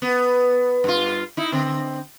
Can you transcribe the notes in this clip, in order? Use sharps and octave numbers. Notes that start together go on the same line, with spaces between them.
B3
G2 F4
D#4 E4
D3 C4